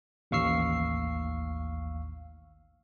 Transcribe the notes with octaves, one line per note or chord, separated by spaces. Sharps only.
A1 D#2 F5 C#6 E6 C7